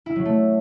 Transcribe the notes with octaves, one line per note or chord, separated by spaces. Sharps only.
E4
F#3
A3